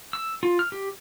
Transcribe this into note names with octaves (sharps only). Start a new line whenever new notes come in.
E6
F4
F6
G4